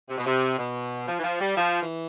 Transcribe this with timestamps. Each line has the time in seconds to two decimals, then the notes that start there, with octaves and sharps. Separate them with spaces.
0.09 C3
0.18 B2
0.26 C3
0.58 B2
1.08 F3
1.20 E3
1.24 F3
1.41 G3
1.57 F3
1.82 E3